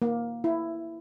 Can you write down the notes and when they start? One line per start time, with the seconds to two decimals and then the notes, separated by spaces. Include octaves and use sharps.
0.02 A#3
0.44 E4